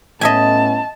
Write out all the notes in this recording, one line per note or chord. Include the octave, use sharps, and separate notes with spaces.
A2 B3 C#4 D#5 E5 G#5 A5